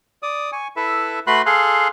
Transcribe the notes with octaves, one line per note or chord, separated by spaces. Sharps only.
D5 D#6
G#5 C#6
E4 A4 B4 E5
A3 F#4 B4 B5 C6 F#6
G#4 A4 F5 C6 F#6